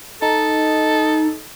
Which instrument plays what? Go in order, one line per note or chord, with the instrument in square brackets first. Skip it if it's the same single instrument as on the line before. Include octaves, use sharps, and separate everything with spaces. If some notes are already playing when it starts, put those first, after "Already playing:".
[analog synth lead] D#4 [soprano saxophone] A4